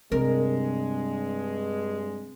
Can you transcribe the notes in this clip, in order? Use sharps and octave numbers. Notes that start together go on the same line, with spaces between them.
G2 C3 G#3 A#4